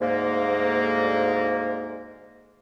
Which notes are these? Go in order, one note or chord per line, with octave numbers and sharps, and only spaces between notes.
D2 G#2 A#3